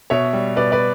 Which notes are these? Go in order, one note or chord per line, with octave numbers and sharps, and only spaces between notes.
B2 C#5 E5
G3
B2 B4 D5
B4 D5